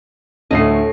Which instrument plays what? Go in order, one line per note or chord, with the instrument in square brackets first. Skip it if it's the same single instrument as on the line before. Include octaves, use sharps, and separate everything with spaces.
[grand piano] D2 A3 C7 [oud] A2 D#5